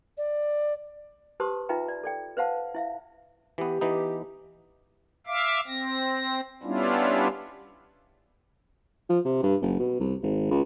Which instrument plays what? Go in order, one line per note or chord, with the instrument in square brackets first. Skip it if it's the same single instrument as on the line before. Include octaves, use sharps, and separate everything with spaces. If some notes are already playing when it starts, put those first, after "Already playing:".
[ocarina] D5
[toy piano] G4 B4 C5 A5 C6 D#6
D#4 F4 B4 E5 G5 A#5
D5
A4 D5 G5
B4 C5 F5 F#5 A5
E4 E5 F5
[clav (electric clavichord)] E3 B3 [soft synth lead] G4
[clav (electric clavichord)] E3 B3 D#4
[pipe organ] E5 F5 D6
C4 A#6
G3 B3 C#4 D4 E4 F4
[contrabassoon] F3
C3
G2
F#1
B2
C2
G#1
C#2